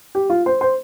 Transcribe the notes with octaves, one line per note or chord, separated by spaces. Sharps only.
G4
F4
C5
C5